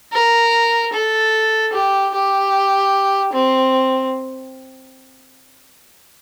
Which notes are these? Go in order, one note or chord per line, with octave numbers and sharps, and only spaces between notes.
A#4
A4
G4
G4
C4